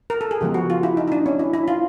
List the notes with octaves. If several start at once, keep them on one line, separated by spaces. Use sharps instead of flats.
A#4
A4
G#4
C#3 F3 G#3 B3 G4
F#4
F4
E4
D#4
D#4
D4
C#4
E4
E4
F4